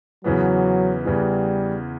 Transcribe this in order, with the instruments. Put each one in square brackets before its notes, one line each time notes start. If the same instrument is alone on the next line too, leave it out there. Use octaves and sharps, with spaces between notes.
[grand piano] E2 C#3 E3 B3 [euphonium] F#3
[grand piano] E2 C#3 E3 B3 [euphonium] G3